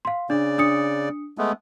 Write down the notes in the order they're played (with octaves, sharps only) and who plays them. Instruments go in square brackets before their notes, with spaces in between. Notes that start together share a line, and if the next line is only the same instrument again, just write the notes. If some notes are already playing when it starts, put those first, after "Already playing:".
[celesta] F5 C6
[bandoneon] C#3 D5 [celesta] D4
[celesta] D4 D#6 C#7
[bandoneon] G#3 A3 B3